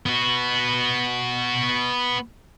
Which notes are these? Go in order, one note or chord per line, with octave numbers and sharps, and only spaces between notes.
B3 F#4